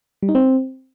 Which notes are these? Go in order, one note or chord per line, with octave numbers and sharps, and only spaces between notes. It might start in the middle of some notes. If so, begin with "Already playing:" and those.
G3
D#4
C4